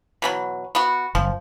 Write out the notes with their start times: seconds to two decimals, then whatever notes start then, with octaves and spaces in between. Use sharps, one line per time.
0.22 B2 E3 F#3
0.75 B3 F#4
1.15 F#1 F3